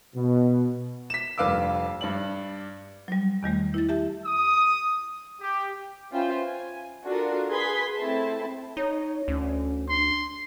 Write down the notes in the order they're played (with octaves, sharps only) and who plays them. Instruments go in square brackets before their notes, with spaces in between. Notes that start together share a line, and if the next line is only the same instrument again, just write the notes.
[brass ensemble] B2
[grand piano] B6 E7
F1 G2 B4 F5 D6 E6
G2 D5 F#7
[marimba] F#3 G3
E2 D#3 G3 A3
E4 A6
G4 E5 A5
[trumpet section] D#6
G4
[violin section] C#4 F4 B4 C5 E5 G5
G#5
D4 F4 F#4 A4 A#4
G#4 B4 C6 G#6 B6
A3 C4 E4 C5 A5
[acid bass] D#4 [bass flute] C#5
[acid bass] D2 [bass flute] C#4
[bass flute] D4 [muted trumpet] C6